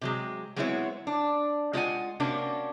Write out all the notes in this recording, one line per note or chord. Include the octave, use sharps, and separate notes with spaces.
C3 F#3 G#3
F#3 G#3 B3 C4 E4 C#5
D4
G#3 F4 C5 D#5 F#5 G#5
C3 A#3 C#4 D4 F#4